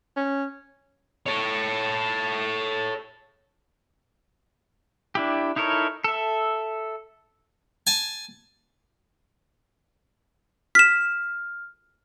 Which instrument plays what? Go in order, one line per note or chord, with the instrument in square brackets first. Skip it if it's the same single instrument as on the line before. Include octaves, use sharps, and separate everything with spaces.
[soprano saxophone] C#4
[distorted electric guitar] A4 C#5
[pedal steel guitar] D4 E4 G4
D#4 E4 A4 A#4 C#5
A4 E5
[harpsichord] G#5 A5
[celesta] F6 [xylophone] B6 E7